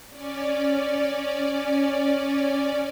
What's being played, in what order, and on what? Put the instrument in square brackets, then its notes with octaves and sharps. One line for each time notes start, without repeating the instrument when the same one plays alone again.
[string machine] C#4 D5